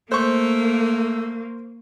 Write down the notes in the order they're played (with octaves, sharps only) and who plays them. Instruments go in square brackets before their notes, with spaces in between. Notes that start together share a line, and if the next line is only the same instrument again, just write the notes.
[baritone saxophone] A3 [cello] A#3 [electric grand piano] C5 C#6